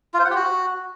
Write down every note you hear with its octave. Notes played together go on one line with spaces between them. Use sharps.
F4
C5
F#5
G4
F#4